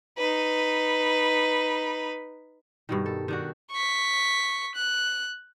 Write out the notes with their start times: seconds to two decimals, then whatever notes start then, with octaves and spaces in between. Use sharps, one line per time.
0.18 D#4 B4
2.89 G2 B2 D#3
3.06 A4
3.28 D#3 D4 F#4
3.72 C#6 B6
4.75 F#6